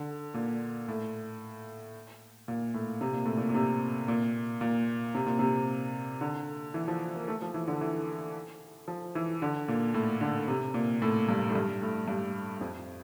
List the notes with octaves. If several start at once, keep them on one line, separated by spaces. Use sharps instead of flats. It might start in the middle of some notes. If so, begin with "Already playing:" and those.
Already playing: D3
A#2
A2
A#2
A2
C3
A#2
A2
A#2
A#2
C3
A#2
A#2
C3
A#2
C3
D3
E3
F3
A#3
A3
F3
E3
D3
E3
F3
E3
D3
A#2
A2
D3
C3
A#2
A2
G2
A2
G2
A2
G2
F2